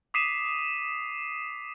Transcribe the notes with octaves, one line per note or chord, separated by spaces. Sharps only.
D6 D#6 B6 C7 D#7 E7